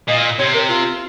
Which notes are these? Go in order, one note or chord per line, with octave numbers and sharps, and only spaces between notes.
A#2 D#5
C3 C#5
A#4
F4